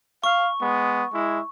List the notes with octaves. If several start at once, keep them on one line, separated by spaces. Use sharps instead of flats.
F5 C#6
G#3 B3
G#3 E4